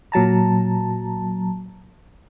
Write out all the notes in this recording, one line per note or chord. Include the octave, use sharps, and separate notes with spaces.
A#2 F#3 A5 A#5